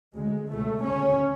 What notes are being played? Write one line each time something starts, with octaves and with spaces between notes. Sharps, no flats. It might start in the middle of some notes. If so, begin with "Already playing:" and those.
D2 C#3 G#3
C#2 B2 A3
D2 C#3 C#4